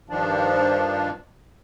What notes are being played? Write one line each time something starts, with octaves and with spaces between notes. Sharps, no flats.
G2 D#3 F3 D4